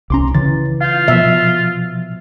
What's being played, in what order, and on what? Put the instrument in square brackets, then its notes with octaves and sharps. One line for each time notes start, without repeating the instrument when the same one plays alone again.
[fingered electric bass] C2 C#4 [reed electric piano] A#5 C6 D6
[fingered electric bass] C#3 [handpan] E3 [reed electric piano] A6
[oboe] F4 [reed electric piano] F5 G6
[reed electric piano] B2 F3 [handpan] E5